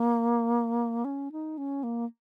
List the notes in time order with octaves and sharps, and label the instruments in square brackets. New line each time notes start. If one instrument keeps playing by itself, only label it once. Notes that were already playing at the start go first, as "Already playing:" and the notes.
Already playing: [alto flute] A#3
C#4
D#4
C#4
A#3